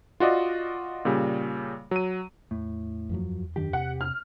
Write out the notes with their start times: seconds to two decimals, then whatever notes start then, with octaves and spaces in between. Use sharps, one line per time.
0.20 F4 F#4 D5 D#5
1.05 A#2 C#3 G3
1.91 F#3 D#7
2.51 E2 A2
3.09 F#2 F3 F#3
3.56 F#2 D#3 D4 G4
3.73 C3 F#5
4.01 F6